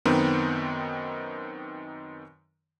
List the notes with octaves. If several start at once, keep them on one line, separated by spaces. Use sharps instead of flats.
F#2 D#3 B3 C4 D#4